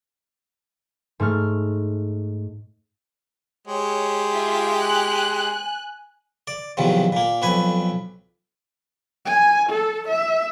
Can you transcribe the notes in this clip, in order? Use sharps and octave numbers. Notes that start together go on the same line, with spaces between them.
G#2 A3 C#6 F6
G#3 G4 C#5
F4 E5 F5
G#5 F#6
D5
B1 E2 C3 D#3 F3
A#2 A#3
B1 F2 B4 G#5
G#5
A4
E5